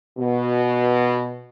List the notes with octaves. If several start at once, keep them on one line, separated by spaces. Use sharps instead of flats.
B2